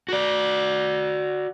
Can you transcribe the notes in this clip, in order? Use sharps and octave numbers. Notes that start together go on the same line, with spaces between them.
F#4 D5